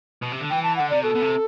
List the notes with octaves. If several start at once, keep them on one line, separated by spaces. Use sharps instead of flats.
B2
C3
D3
E3 G5
A5
D3 F#5
C3 D5
B2 A4
B2
C3